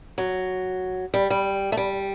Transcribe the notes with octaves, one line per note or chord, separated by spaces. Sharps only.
F#3
G3
G3
A3
G3